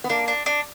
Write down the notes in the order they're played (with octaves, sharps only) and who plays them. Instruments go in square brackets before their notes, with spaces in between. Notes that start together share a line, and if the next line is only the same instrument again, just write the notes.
[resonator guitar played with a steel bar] B3
[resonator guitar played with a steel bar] A#3 [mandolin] D4
[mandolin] D4
D4